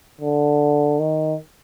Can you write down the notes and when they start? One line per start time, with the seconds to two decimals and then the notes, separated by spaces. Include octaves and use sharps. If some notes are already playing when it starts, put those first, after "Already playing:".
0.21 D3
0.99 D#3